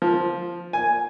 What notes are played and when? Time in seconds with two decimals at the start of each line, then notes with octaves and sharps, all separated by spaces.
0.02 F3
0.73 G#5